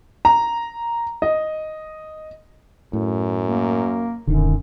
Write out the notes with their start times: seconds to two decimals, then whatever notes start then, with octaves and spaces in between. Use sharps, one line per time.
0.25 A#5
1.22 D#5
2.93 F#2 A2
3.47 A#3
4.27 D#1 F#2 D3 D#3